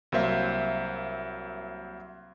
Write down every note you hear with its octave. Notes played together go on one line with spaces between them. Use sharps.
C2 F#3 A#3 C5 E5 F5